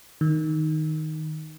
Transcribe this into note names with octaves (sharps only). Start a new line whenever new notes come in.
D#3